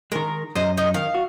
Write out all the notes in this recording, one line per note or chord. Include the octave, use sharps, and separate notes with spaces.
D#3 G#3 A#4
F#2 C5 D#5 A#5
D#4 D#5
D#3 F5
F#4